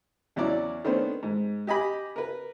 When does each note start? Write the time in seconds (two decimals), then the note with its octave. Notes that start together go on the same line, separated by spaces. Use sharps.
0.36 E2 F#3 C#4 E4 D5 D6
0.84 D#3 A3 B3 C#4 D4 C5
1.23 G#2
1.67 G4 D#5 G#5 B5 D6
2.16 A#4 B4